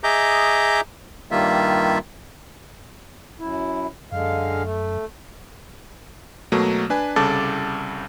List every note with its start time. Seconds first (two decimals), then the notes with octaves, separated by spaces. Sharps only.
0.04 G#4 D#5 E5 A#5 D6 G6
1.31 G2 D#3 G3 A#3 F4 E5
3.40 F#2 E4
4.12 F#2 D3 G#3 F5
4.63 A3
6.52 B2 F#3 A3 A#3
6.90 D4 B4 G#5
7.16 C2 C#3 A4 A5 D6 A6